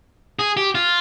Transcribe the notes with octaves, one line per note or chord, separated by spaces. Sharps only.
G#4
G4
F4